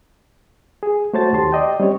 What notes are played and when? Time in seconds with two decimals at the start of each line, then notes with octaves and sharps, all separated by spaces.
0.83 G#4
1.14 A3 F#4 C5 C#5 A5 A6
1.33 D#2 D#3 G4 A5 C6
1.52 D5 D#5 G5
1.80 G3 C4 C#4 C#5